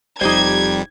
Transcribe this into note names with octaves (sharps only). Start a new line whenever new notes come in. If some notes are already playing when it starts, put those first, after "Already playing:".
E1 F2 G3 D#4 G4 C5 G#6